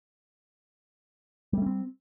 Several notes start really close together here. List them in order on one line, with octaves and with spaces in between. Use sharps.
G3 A3 C#4 C4